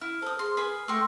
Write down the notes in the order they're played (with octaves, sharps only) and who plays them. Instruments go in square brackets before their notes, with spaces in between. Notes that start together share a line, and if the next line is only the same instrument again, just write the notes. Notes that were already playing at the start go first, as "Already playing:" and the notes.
[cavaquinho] E4 [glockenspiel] F6
[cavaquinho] A4 D#6 [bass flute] C5
[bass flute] G#4 [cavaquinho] C6
[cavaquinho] B4 G#5 B5 [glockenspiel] D#6 C7
[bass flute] A3 [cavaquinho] G5 C6 C#6 [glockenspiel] E6 A#6